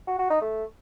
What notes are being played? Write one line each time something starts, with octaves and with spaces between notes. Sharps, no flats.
F#4
F#4
D#4
A3